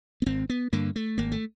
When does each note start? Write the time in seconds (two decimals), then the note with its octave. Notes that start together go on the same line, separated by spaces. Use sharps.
0.22 B3
0.26 G#1 C4
0.50 B3
0.73 G2 D3 A#3
0.96 A3
1.18 G#1 A#3
1.32 A3